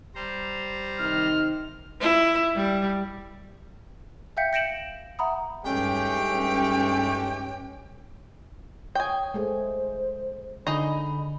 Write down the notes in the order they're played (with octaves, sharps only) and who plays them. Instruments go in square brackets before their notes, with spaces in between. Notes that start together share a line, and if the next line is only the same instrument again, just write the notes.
[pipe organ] G3 C5 A#5
[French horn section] C3 D#3 D#4 [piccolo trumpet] F6
[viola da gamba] E4
G3
[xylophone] E5 F5 G5 G6 B6 C#7
G6 A#6 C#7 D7 E7 F#7
E5 F#5 A#5 B5 D#6
[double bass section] G2 C#4 [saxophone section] G#3 A3 D#4 [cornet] G4 [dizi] G5
[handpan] C#5 [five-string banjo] G5 G#5 [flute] D#6
[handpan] G#3 A3 G#4 [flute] C5
[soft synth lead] D3 [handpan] D4 [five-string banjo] D#4 G#4 D#5 [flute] B5